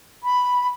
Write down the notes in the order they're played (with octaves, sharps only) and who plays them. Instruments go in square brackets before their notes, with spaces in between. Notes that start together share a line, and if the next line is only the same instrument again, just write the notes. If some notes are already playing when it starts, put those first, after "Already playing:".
[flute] B5